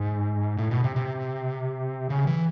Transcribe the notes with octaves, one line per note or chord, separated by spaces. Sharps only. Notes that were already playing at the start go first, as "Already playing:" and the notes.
Already playing: G#2
A2
B2
C3
C3
C#3
E3